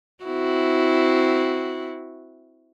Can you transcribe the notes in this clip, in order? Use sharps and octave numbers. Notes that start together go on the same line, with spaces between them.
C4 E4 F#4